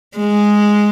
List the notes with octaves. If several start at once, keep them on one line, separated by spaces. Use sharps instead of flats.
G#3